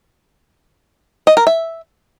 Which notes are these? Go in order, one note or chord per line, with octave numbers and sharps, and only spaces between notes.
D#5
A#4
E5